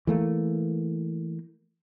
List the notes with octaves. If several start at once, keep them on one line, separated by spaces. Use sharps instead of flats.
E3 A3 A#3